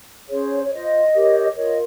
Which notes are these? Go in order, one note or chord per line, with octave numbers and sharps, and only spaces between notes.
C#4 G#4 C5 C#5
C#5
F4 C5 D#5
G4 A#4 C#5
F4 A#4 C#5 D#5